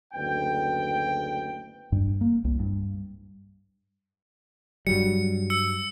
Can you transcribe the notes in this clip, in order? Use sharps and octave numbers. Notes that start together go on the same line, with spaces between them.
F#1 D2 B3 G5
G2
A#3
C2
G2
G2 F#3 G3 C#7
E6 C#7